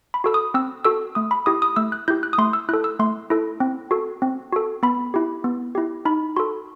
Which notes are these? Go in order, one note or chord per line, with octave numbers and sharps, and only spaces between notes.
B5
F#4 A4 E6
D#6
C4 E6
F#4 A4 E6
A3 D#6
B5
E4 G4 D#6
D#6
A3 E6
F#6
E4 G4 G6
F#6
D#6
A3 C6
E6
E4 A4 F#6
E6
A3 C6
E4 A4
C4
F#4 A4
C4
F#4 A4
B3 B5
E4 G4
B3
E4 G4
D#4 B5
F#4 A4 C6